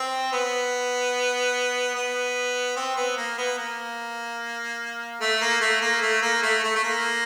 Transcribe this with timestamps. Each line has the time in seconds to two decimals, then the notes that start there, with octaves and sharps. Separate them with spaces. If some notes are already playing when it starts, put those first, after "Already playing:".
Already playing: C4
0.32 B3
1.94 B3
2.76 C4
2.96 B3
3.17 A#3
3.38 B3
3.58 A#3
5.21 A3
5.41 A#3
5.61 A3
5.81 A#3
6.02 A3
6.22 A#3
6.42 A3
6.63 A3
6.76 A3
6.84 A#3